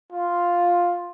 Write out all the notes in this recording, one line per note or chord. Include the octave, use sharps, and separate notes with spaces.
F4